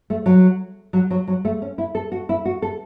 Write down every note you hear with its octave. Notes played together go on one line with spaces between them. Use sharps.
A3
F#3
F#3
F#3
F#3
A3
C#4
E4
A4
F#4
E4
F#4
A4